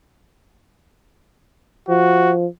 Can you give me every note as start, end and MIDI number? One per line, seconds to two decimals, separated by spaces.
1.89 2.46 53
1.89 2.32 66